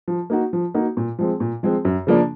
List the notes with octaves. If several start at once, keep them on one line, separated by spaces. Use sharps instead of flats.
F3
A#3 D#4 F#4
F3
A#3 D#4 F#4
A#2
F3 G#3 C4
A#2
F3 G#3 C4
F#2
C#3 F3 A#3 D4